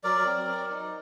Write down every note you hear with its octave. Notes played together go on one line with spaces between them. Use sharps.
F#3 A#4 D5
C4
F#3
D#4